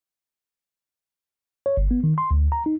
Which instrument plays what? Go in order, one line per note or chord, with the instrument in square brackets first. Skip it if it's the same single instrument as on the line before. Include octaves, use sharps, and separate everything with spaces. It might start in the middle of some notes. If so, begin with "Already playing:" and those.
[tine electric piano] C#5
G1
B3
D#3
C6
D2
A#5
D#4